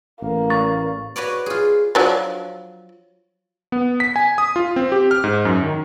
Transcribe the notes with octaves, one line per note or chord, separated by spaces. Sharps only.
A1 A#3
A3 C#6 A6
F#4 B4 C#5 D5
F4 G#4
F3 F#3 D4
B3
B6
G#5
D#6
F4
C4
G4
F6
G#2
F#2
D#3